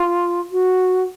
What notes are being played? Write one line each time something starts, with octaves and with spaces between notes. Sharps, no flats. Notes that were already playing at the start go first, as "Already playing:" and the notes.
Already playing: F4
F#4